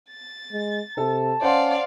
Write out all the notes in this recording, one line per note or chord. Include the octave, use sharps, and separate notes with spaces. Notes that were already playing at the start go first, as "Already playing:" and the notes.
A6
G#3
C3 A4 A5
C#4 C5 D5 F5 F#5 C6